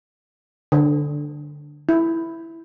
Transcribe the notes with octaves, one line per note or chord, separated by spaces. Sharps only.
D3
E4